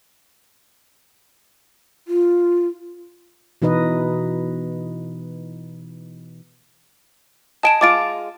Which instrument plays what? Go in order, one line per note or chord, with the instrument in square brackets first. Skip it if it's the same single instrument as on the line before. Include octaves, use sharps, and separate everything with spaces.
[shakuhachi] F4
[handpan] B2 E3 D#4 B4 D#5
[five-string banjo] D#5 G#5 [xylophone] A5 D7 E7
[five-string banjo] G#3 F4 [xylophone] D6 A6 D7